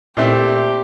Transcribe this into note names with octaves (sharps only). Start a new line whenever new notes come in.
A#2 A3 C4 E4 G4